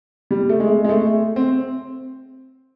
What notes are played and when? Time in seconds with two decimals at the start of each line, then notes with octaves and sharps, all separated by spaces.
0.31 G3
0.49 A3
0.60 G#3
0.84 G#3
0.89 A3
1.36 C4